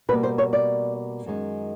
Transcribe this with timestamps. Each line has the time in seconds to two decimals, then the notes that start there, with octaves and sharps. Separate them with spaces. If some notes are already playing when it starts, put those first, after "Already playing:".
0.09 B2 G3 A#3 B4
0.23 C5
0.38 C#5
0.53 D5
1.26 F#2 D#3 G#3